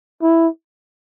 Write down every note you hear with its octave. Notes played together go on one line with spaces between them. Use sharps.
E4